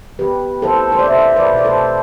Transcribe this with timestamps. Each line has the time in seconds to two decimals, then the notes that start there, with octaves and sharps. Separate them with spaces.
0.19 B3 G4 B4
0.62 E4 A4 C5
0.92 C5
0.99 D5
1.07 B2 C5 E5
1.37 B4 D5
1.50 B2
1.57 D5
1.65 A4 C5